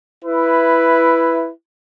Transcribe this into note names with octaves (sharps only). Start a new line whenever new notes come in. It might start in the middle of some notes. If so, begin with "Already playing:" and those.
E4 B4